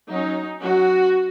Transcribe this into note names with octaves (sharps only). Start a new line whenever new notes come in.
F#3 C#4 D#4
F#3 C#4 F#4